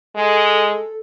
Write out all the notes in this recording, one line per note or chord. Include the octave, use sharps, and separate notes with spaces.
G#3 A4